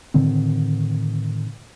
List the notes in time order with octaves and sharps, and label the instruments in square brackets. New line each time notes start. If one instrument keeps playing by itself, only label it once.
[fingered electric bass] A2 D3 D#3 C4